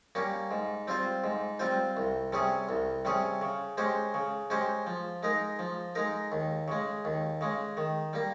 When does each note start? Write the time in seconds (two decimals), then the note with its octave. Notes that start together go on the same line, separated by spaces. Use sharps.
0.15 G3 A#3 C#4 G4
0.51 G#2
0.87 G3 C4 F4 C5
1.24 G#2
1.59 G3 C4 F4 C5
1.97 C2
2.32 C3 G3 C#4 G#4
2.69 C2
3.05 C3 G3 C#4 G#4
3.41 C#3
3.77 G#3 C#4 G4 C5
4.14 C#3
4.50 G#3 C#4 G4 C5
4.87 F3
5.23 G#3 D#4 A#4
5.59 F3
5.95 G#3 D#4 A#4
6.32 D#2
6.68 C#3 G#3
7.05 D#2
7.41 C#3 G#3
7.77 D#3
8.13 G3 A#3